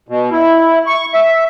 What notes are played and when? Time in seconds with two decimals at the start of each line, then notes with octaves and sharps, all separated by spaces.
0.09 B2
0.31 E4
0.86 C#6
1.14 E5